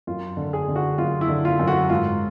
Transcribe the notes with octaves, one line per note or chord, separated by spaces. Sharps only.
F#2 F4
D3
G#4
D3
F#4
F#2 F4
E4
D3
F4
F#2
F#4
G#2 F4